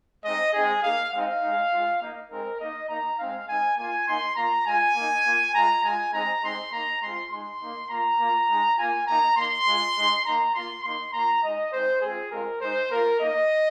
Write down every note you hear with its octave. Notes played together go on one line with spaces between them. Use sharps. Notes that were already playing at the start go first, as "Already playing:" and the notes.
G#3 C4 D#4 D#5
G#3 C4 D#4 G#4
A#3 D#4 F5
G#3 C4 D#4 F5
G#3 D#4
G#3 F4
A#3 D#4
G#3 C4 D#4 A#4
A#3 D#4 D#5
A#3 D#4 A#5
G#3 C4 D#4 F5
G#3 C4 D#4 G#5
A#3 F4 G#5
A#3 D#4 C6
A#3 F4 A#5
G#3 F4 G#5
A#3 D#4
A#3 F4
G#3 F4 A#5
G#3 F4 G#5
G#3 C4 D#4 A#5
G#3 C4 D#4 C6
A#3 D#4 A#5
G#3 C4 F4 C6
G#3 D#4 C6
A#3 D#4
A#3 F4 A#5
A#3 F4
G#3 D#4
A#3 F4 G#5
A#3 D#4 A#5
A#3 D#4 C6
G#3 F4
G#3 D#4
A#3 D#4 A#5
A#3 F4 C6
A#3 D#4 C6
A#3 F4 A#5
G#3 D#4 D#5
G#3 C4 D#4 C5
G#3 C4 F4 G#4
G#3 C4 F4 A#4
G#3 D#4 C5
A#3 F4 A#4
A#3 D#4 D#5